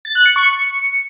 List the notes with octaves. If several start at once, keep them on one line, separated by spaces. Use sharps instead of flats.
A6
F#6
C#7
C#6
C#7